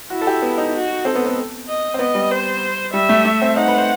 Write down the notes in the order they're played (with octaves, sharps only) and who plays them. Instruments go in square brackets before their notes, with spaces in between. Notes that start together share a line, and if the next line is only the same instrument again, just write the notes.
[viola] E4 [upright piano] F#4
[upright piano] A4
G4
B3
D#4
[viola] F#4
[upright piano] C4 [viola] A4
[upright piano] B3
B3
[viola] D#5
[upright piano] C4
[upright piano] B3 [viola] D#5
[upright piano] G3
[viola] C5
[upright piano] G3 [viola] E5
[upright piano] A3
A3
C4
[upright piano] D#4 [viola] F#5
[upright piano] B4
C5